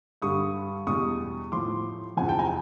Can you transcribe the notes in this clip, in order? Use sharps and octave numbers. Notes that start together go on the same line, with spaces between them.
G2 D3 G3 C#6 D#6
E2 B2 G3 C#6 D#6
A2 F3 C6 D6
E2 C3 F3 F#5 G#5
G5 A5
G#5 A#5